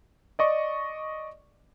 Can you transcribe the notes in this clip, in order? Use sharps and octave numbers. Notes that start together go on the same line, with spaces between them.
D5 D#5 C#6